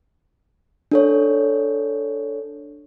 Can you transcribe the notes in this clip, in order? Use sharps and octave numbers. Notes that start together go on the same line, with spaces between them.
D4 A4 C#5